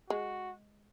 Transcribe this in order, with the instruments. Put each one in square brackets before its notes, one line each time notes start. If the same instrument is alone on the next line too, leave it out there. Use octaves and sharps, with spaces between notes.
[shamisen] G#3 [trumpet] F#4